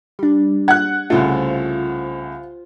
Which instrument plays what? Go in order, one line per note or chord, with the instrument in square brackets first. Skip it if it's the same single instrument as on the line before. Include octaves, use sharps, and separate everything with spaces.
[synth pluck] G3 D4
[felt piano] F#5 F#6 [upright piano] G#6
[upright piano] C2 C#3 A3 [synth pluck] F4 C5